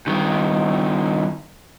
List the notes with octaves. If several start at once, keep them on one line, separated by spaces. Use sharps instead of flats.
G2 D#3